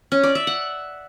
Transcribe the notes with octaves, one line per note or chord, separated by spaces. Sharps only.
C#4
D5
E5
F#5